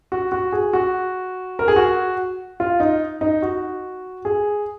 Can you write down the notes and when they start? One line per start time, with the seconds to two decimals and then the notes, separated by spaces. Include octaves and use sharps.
0.12 F#4
0.32 F#4
0.52 G#4
0.73 F#4
1.59 A#4
1.68 G#4
1.76 F#4
2.60 F4
2.80 D#4
3.21 D#4
3.42 F#4
4.25 G#4